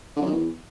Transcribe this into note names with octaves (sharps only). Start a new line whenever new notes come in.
D3
F#2
D#3
E2